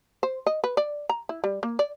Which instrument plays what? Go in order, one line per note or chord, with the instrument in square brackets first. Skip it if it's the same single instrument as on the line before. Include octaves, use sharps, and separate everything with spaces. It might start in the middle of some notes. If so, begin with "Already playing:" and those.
[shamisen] C5
D#5
B4
D5
A#5
E4
G3
A#3
D5